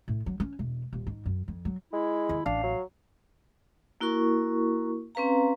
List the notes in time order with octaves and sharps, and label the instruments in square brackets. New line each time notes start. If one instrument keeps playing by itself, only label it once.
[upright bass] A2
F#3
C#4
E1
D#1
G#2
F#2
F2
F#3
[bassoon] G#3 [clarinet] E4
[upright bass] D#2
[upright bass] A1 [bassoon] D4 [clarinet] F5
[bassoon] F#3
[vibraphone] A#3 E4 F#4 A#4 C#6
C4 C#4 B4 F5 A#5